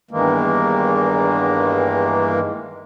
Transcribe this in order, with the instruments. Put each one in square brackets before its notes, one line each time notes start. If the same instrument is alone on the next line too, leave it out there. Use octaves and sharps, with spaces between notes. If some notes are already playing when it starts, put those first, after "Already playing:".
[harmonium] E2 G2 D#3 E3 G#3 A#3